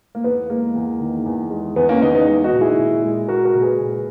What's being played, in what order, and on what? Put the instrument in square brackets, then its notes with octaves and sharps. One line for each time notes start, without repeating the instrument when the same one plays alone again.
[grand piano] A#3
E2 B3
G#3 A#3
E2
D#3
E2
G#3
E2 B3
A#3 C#4
D#3 B3 D#4
B3 D#4
G#3
D#4 F#4
A#2
E4 G#4
A#2
G#3
G#3 F#4 A#4
F#4 A#4
A#2
G#4 B4
A#2